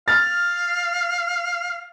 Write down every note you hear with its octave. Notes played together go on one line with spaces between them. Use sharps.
F5 F6 A6